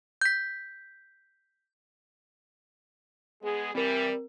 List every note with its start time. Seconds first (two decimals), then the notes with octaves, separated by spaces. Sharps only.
0.21 G6 B6
3.43 G#3 B3 G#4
3.75 E3 G3 C4 A#4